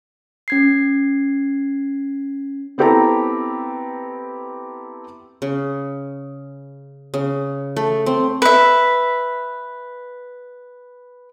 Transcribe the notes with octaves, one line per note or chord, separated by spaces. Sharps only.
C#4 G#6 C7
B3 C4 E4 G4 A4 A#5
C#3
C#3
A3
C4
B4 E5